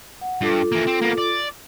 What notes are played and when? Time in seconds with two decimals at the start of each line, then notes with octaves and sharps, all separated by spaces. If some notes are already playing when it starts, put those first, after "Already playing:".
0.21 F#5
0.41 G2 F4 A4 D6
0.72 E3 A#3
0.87 C4
1.02 A#3 B3
1.18 D5